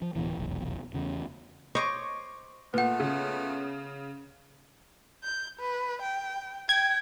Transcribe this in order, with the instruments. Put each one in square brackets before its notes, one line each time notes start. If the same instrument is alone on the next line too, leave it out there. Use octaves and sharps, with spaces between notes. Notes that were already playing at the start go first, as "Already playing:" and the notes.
[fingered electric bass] F3
D1 A#1 B2 E3
F1 B1 E2
E2 C#3
[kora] C5 C#5 D#5 [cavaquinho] C#6 D6
[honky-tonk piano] A#2 [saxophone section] A3 B3 F4 [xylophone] B4 F#5
[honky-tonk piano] C#3
[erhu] G6
B4
G5
[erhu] G5 [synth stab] G#6